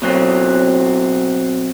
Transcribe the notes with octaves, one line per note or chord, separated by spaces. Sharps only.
B2 F#3 C4